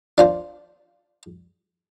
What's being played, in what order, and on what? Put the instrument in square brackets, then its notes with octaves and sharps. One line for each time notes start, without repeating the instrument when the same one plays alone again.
[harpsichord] D4 F4 C5